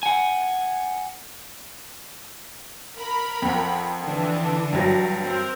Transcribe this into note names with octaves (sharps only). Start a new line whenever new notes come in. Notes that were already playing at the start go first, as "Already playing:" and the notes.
F#5 G#5
A#4 B5
F2 F#5
D3 E3 D4
G2 F#3
C4 A#4